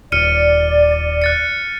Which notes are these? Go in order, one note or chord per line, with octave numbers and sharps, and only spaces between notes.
D#1 D5 F6 C#7 D#7
F#6 A6 C#7